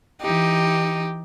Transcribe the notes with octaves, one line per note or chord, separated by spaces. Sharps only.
E3 D#4 G4